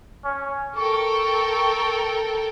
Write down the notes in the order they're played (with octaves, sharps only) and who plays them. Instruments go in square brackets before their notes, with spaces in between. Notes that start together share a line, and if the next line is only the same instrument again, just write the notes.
[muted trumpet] C#4
[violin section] A4 A#4 G5 [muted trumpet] C#6